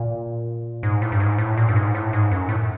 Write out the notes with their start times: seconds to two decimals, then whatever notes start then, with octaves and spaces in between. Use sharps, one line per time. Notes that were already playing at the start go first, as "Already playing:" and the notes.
Already playing: A#2
0.83 G#2
1.02 A2
1.12 G2
1.20 G#2
1.38 A2
1.57 A#2
1.69 G2
1.76 G#2
1.95 A2
2.13 G#2
2.31 F#2
2.49 A2